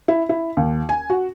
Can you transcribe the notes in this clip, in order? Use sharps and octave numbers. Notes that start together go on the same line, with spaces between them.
E4
E4
D#2
G#5
F#4